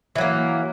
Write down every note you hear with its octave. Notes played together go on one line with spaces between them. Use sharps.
E3 F#3 A#3